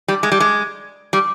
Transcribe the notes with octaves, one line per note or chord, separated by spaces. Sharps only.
G3
G#3
G3
G#3
G3